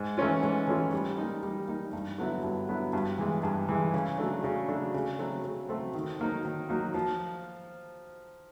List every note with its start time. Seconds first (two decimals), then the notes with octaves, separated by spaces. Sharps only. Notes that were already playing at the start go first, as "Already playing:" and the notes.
Already playing: G#2
0.18 E3 A3 C#4 F4
0.43 G#2
0.67 E3 A3 C#4 F4
0.92 G3
1.18 A#3 D#4
1.43 G3
1.68 A#3 D#4
1.93 G2
2.18 D3 F#3 B3 E4
2.43 G2
2.69 D3 F#3 B3 E4
2.93 G2
3.18 E3 G#3
3.43 G2
3.69 E3 G#3
3.94 C#3
4.18 F#3 A3 D4
4.44 C#3
4.68 F#3 A3 D4
4.94 C#3
5.19 F#3 A3 C4
5.44 C#3
5.69 F#3 A3 C4
5.94 D#3
6.19 F#3 A#3 D#4
6.45 D#3
6.69 F#3 A#3 D#4
6.94 F3